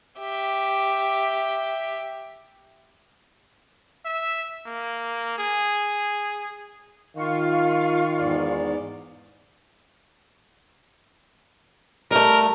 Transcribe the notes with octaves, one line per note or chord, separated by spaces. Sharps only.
G4 E5
E5
A#3
G#4
D#3 F4 F5 C#6
E2 G#2 D5
G3 A3 A#4